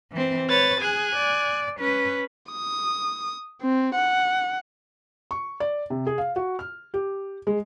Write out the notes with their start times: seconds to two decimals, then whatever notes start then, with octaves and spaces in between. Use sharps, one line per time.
0.12 E3 C4
0.49 B4 C#5 A6
0.80 G#4 G#5 F#6
1.16 D5
1.80 C#4 B4
2.52 D#6
3.62 C4
3.96 F#5
5.31 C#6
5.60 D5
5.90 C3
6.07 G#4
6.18 F5
6.36 F#4
6.59 F6
6.94 G4
7.47 G#3